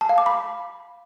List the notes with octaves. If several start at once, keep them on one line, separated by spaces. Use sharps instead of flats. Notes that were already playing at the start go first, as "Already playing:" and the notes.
A5
F5
D6
B5